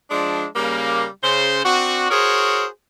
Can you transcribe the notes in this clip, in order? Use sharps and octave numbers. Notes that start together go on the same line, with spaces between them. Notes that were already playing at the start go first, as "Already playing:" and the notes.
F3 G#3 D4
C#3 G3 A#3
C#3 C5
C4 D4 F#4
F#4 G#4 A#4 C5 C#5